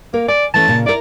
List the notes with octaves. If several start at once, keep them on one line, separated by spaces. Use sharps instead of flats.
A#3 A#4
D5 G#5
E3 A3 C#4 A5
A#2 C#3
E4 A#4 D5